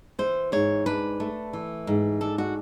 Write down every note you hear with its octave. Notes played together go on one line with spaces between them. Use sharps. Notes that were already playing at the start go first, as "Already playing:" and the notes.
E3 C5
G#2 C#5
D4 B4
A3
E3
G#2
D4 A4
F#4